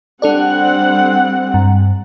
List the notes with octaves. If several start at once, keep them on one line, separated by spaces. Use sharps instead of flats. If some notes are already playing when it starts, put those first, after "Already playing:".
G3 C4 D4 A4 D5 F#5
G2